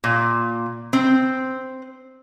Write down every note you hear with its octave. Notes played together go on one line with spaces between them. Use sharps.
A#2
C4